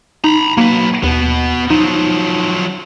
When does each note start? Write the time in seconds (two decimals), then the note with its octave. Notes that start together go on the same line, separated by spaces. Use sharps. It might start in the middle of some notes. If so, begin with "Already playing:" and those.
0.24 D#4 A#5 B5
0.58 F#3 A#3 B4
1.04 D#2 B2 B3
1.70 F3 F#3 D#4